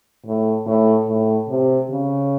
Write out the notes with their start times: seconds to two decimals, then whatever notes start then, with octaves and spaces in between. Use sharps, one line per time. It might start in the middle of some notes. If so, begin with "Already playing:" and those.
0.26 A2
0.66 A2
1.08 A2
1.49 C3
1.90 C#3